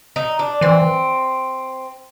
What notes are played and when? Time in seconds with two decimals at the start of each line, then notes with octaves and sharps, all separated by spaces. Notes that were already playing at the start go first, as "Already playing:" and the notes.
0.16 D#4
0.39 D4
0.61 E3 C4